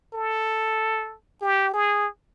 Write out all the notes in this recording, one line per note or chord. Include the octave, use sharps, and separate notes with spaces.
A4
G4
G#4